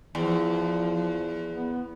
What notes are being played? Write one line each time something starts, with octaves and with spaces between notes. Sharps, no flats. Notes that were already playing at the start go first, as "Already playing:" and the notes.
E2 F3
B3